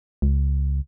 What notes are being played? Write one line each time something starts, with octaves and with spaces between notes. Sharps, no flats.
C#2